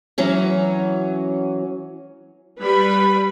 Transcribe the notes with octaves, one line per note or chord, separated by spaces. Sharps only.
E3 F#3 C#4
G3 B4 B5